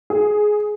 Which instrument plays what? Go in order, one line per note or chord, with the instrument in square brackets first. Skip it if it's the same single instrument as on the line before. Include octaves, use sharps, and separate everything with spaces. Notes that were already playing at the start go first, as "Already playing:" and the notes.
[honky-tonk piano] G#4